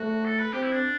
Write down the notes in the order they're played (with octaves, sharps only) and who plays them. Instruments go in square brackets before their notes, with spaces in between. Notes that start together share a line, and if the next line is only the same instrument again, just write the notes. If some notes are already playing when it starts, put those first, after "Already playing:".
Already playing: [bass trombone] A3 [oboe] F#4
[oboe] A4
B4
[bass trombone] C4 [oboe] G4
[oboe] E4
D4